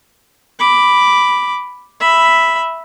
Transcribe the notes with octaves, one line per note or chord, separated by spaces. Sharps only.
B5 D6
E5 B5